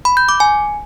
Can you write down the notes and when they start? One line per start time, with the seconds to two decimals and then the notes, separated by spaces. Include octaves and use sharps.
0.05 B5
0.17 G6
0.29 D6
0.40 G#5